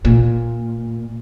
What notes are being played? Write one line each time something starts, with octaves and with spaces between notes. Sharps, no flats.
A#2